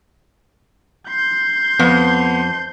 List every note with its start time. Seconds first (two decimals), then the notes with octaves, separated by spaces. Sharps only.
1.09 C6 G6
1.79 F2 B3